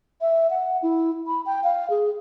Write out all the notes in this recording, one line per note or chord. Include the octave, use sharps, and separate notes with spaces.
E5
F#5
E4
B5
G5
F5
G#4